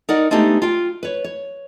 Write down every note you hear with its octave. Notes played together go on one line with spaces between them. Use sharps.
D#4 A#4 D5 F#5
G#3 A3 B3 D4 D#4 G4
F4 G5
B4 C#5
C#5